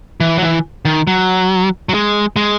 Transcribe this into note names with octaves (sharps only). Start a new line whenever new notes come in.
E3
F#3
E3
D#3
F#3
F#3
G#3
G#3